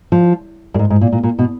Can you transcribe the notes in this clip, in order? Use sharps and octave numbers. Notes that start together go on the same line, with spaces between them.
F3
F#2
G#2
G#2
A#2
A#2
A#2
B2